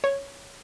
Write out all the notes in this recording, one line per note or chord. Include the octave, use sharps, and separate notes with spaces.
C#5